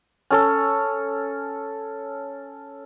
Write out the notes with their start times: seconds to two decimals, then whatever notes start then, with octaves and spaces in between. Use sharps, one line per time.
0.30 C#4 A4